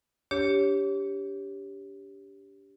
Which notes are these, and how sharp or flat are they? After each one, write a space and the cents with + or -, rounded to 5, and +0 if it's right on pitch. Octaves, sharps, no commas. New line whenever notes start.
D4 -35 G4 +0 C#5 +0